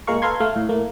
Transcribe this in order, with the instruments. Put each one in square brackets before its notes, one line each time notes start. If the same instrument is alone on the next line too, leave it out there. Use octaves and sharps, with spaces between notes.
[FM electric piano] A#2 G#3 A#4 F5 C#6
A4 B4 F5 A#5 C6 G#6
A3 F5
A2
A2 A3 A#3